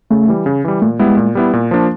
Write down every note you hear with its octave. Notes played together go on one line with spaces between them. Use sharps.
C#3 A3
E3 G3
C#3
E3 G3
A#2 A3
G3 G#3 B3 E4
A#2
G3 B3 E4
A#2
F3 A#3 D4